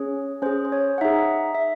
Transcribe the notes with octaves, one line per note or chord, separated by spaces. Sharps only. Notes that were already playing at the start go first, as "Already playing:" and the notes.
Already playing: C#4 G#4 C#5
C#4 G#4 C5
C5
C#5
F#5
D#4 G#4 E5
E5